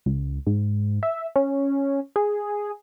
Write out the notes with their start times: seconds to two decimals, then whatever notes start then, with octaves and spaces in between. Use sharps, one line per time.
0.06 C#2
0.46 G#2
1.03 E5
1.36 C#4
2.16 G#4